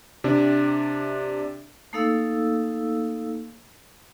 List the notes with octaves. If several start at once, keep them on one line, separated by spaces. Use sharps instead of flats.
C3 D4
A3 A#3 D#4 A4 F5 E6